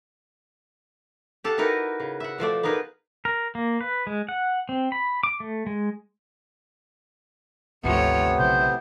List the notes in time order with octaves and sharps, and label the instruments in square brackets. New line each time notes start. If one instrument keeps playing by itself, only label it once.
[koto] G4 A4 F5 F#5 A5
D#4 E4 F#4 A#4 B4
C#3
E5 F#5
B2 F3 A3 D5
B3 D#4 G#4 A#4 B4
[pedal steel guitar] A#4
A#3
B4
G#3
F#5
C4
B5
D6
A3
G#3
[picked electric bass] G#1 D2 [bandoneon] C3 B3 [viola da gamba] F3 A3 C#5
[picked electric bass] B1 C#3 [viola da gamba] E4 [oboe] C5